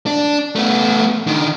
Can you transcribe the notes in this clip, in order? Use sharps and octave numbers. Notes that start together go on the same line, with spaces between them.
D4
A3 B3
D3 D#3